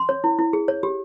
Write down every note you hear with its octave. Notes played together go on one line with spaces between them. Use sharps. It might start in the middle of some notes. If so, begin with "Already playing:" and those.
Already playing: C6
C#5
E4
E4
G#4
C#5
G4